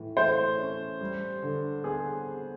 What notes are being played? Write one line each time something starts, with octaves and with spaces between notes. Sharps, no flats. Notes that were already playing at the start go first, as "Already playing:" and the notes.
Already playing: A2 E3
A3 C5
C#4
G3
D3
B3 G#4